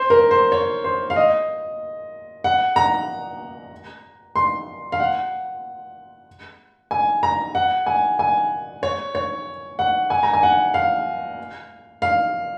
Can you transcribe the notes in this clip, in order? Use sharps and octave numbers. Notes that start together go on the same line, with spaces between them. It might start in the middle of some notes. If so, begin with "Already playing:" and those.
Already playing: C5
A#4
C5
C#5
C5
F5
D#5
F#5
A#5
C6
F5
F#5
G#5
A#5
F#5
G#5
G#5
C#5
C#5
F#5
G#5
A#5
G#5
F#5
F5
F5